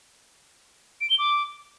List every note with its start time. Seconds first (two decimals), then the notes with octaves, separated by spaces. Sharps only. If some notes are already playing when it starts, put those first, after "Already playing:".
1.01 D7
1.10 G7
1.19 D6